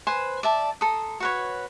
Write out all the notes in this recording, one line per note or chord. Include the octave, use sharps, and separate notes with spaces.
B4 C5 G#5
D5 E5 A5
A4 A#5 C6 D#6
F#4 B4 C#5